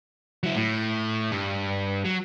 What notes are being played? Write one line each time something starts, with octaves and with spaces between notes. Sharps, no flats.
F#3 E4
A2
G2
F#3